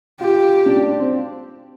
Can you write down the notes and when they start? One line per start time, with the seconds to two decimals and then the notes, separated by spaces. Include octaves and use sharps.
0.20 F4 G4
0.66 D4
0.76 D4
0.99 C4